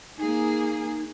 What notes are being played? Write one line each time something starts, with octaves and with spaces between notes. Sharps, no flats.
A#3 D#4 G#4